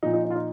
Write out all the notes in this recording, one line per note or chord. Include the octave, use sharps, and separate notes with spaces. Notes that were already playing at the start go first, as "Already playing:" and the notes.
A#2 F3 D#4
D#4
D#4
F4
D#4